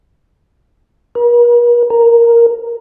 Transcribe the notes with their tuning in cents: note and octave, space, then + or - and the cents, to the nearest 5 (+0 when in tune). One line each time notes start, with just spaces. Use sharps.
A#4 +45
A#4 +0